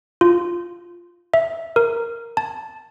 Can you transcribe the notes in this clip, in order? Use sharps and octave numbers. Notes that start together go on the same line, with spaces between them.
F4
E5
A#4
A5